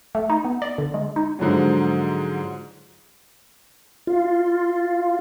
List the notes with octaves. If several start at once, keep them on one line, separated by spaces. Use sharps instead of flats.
A3
D#4
B3
D5
D3
G#3
D#4
G#2 D3 F3 F#3
F4